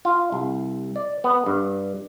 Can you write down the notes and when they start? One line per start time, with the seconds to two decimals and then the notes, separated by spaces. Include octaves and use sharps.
0.05 F4
0.32 C2
0.96 D5
1.24 B3
1.46 G2